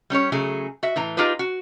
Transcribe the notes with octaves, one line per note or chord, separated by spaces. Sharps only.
G3 C#4 G4 C#5
C#3 F#3 A3 G#4
F#4 E5
A2 E3 A#5
D#4 F4 G4 G#4 B4
F#4